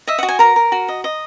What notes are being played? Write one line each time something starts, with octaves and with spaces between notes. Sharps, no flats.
D#5 E5
F#4 F#5
G#5
A#4 A#5
A#4
F#4
D#5
D#5